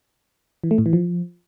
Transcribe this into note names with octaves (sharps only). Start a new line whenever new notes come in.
E3
A3
A2
E3
F3